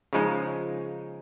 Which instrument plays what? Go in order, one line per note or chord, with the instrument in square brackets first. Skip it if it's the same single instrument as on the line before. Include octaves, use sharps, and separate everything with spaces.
[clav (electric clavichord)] C#3 F3 G#3 D#4